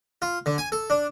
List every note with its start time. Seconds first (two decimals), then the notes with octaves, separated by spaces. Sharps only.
0.22 F4
0.46 D3
0.58 G#5
0.72 A4
0.90 D4